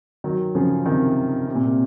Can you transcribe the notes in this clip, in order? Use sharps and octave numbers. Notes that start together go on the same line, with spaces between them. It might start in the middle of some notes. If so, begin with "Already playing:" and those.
D#3 F#3
C#3 F3
C3 D#3
C3
A#2
C3